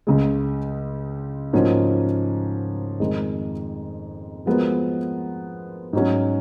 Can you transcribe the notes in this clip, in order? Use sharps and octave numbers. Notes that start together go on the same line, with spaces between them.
C#2 C#3 G#3
G#2 F3 A#3 C#4 F#4
F2 D#3 G#3 D#4
F3 G#3 B3 F#4 A#4
G#2 F#3 C#4